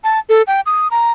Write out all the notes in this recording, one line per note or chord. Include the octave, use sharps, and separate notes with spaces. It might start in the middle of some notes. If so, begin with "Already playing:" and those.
A5
A4
G5
D#6
A#5